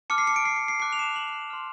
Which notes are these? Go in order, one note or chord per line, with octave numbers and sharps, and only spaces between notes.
A5 D6 F6 C#7
C7
C#7
D7
C7
C7
C7
A5 D6 F#6 C7
F7
E7
F7
F#7
C6 F6